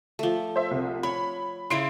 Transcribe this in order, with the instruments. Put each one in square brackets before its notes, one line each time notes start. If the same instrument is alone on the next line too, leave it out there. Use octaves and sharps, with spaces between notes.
[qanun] F3 A3
[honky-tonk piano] C5 E5
C2
[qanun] C#5 [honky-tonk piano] B5
[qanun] C#3 E4 C#5 [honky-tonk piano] C6 C7 D7